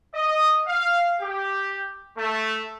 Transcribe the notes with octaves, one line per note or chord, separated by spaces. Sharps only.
D#5
F5
G4
A3